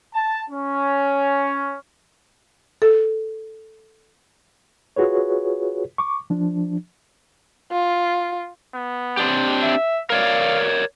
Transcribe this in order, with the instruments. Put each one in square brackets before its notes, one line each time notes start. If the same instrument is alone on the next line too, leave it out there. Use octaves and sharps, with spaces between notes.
[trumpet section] A5
C#4
[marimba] A4
[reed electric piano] F4 F#4 G#4 B4 C#5
C#6 D6
F3 D4
[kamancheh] F4
[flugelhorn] B3
[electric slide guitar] C4 D4 G4
[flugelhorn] E5
[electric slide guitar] A#4 C#5 D5 [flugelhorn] F5